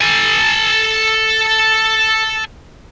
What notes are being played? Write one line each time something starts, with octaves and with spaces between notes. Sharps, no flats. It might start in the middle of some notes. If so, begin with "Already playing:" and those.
A4 G#5